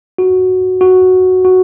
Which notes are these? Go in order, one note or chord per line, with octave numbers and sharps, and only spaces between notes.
F#4
F#4
F#4